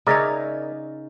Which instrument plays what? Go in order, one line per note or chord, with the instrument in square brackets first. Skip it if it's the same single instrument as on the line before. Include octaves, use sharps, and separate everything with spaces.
[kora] C#3 D#4 C#5 [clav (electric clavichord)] A#4 D5 E5